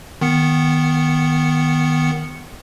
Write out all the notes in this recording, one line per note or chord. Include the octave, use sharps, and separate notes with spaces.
D#3 B3 C#7